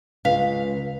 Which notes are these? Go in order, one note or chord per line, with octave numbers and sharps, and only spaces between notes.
C#2 B4 F5 B6 F7